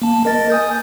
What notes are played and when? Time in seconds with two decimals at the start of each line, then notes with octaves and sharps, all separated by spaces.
0.02 A#3 A5
0.25 A#4 D#5 A6
0.50 G#5 D#6 G6